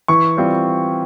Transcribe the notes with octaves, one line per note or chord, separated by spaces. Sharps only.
E3 C#6
G3 C4 F4